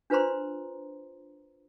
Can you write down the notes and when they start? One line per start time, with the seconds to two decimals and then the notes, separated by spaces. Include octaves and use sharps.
0.10 D4 F4 B4 C5 A#5 C6